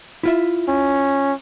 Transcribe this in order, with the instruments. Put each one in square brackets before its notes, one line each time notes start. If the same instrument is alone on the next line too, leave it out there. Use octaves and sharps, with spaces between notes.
[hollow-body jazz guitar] E4 F4 E5
[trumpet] C#4